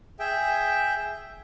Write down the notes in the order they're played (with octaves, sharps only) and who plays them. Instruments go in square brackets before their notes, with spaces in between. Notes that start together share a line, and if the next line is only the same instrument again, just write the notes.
[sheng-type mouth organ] G#4 E5 G5